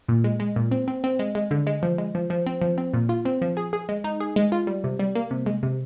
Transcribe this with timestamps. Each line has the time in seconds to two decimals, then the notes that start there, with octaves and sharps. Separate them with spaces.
0.08 A#2
0.24 G#3
0.40 G#3
0.56 A#2
0.71 C4
0.88 C4
1.04 C4
1.19 G#3
1.35 G#3
1.51 D3
1.67 G#3
1.83 F3
1.98 G#3
2.15 F3
2.30 F3
2.47 C4
2.62 F3
2.78 C4
2.94 A#2
3.09 F4
3.25 C4
3.42 F3
3.57 G#4
3.73 G#4
3.89 G#3
4.04 D#4
4.20 G#4
4.36 G#3
4.52 F4
4.67 G3
4.84 C3
4.99 G3
5.15 A#3
5.31 C3
5.46 G#3
5.63 C3